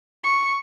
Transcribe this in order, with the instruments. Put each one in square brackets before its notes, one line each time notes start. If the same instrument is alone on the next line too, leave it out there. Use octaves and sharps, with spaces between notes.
[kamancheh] C#6